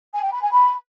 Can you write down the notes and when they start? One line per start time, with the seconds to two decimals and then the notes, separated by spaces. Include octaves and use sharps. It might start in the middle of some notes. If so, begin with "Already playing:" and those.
0.14 G#5
0.23 G5
0.33 B5
0.42 G#5
0.52 B5